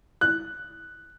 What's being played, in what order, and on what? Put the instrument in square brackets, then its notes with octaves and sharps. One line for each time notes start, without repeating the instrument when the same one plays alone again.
[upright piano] F#6